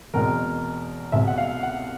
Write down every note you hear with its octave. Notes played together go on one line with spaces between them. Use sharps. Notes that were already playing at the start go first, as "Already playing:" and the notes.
E2 B2 G#3 C4 A#4
C2 B2 G#3 E5
F#5
F5
F#5